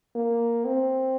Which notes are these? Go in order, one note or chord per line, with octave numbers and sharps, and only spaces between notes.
A#3
C4